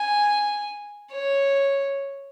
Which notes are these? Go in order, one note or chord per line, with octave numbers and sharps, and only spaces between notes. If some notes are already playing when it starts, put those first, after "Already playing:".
Already playing: G#5
C#5